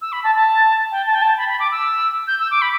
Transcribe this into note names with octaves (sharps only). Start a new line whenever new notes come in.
E6
B5
A5
A5
G5
A5
G5
A5
B5
B5
D6
E6
G6
E6
D6
B5